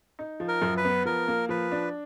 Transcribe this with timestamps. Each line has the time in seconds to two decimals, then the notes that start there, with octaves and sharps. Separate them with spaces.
0.19 D#4
0.40 F3
0.48 A#4
0.62 F#2
0.77 B4
0.85 B3
1.05 F3 A#4
1.28 A#3
1.49 F3 B4
1.72 D4